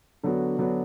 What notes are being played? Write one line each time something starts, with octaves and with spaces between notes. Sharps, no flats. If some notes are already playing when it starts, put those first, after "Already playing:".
D3 F#3 B3 D4 F#4
D3 F#3 B3 D4 F#4